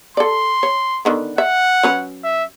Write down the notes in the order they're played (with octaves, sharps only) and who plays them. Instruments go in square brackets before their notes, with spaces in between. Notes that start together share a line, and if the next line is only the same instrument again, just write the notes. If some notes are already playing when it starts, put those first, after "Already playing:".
[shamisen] A4 D5 [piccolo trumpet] C6
[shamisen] C#5
D3 D#3 B3
[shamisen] E5 [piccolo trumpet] F#5
[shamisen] F#3 C#4 B4
[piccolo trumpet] E5